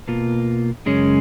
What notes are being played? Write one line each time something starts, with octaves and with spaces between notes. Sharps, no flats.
B2 A#3 F4
F#2 C#3 G#3 C#4